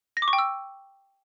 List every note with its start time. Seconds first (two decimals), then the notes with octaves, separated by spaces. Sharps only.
0.17 A#6
0.22 D6
0.28 C#6
0.33 G5
0.38 E6